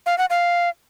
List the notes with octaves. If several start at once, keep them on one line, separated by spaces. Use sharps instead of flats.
F5
F#5
F5